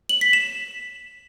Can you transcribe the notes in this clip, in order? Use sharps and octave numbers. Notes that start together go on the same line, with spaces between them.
F#7
B6
E7